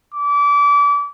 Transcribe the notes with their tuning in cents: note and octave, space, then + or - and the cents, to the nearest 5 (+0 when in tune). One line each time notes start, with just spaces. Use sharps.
D6 -30